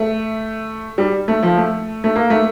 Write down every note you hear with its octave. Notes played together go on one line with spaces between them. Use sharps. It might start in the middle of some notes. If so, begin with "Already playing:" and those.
Already playing: A3
G3
A3
F3
A3
A3
A#3
A3